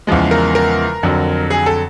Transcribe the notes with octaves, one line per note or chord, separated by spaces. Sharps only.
E2 C#3 F3 G#3
A#4
A#4
F2 D3 F#3
G#4
A4